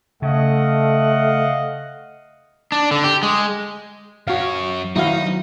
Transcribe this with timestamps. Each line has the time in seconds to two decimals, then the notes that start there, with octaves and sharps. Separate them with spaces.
0.22 C#3 A3 D#5 F5 F#5
2.72 D4
2.91 D3
3.04 G4
3.23 G#3
4.28 F#2 F#4 C#5 F5
4.96 D#3 F#3 D#4 E4 F#4 F5